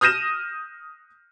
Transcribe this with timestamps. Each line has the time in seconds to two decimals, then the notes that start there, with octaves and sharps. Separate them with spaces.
0.01 D#6 F6 G6 A#6 D#7 E7